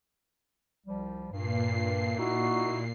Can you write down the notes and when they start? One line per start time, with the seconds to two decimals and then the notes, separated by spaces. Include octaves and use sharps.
0.86 C2 F3 G3
1.31 G2 A#2 C7
2.18 D#4 E4 F#4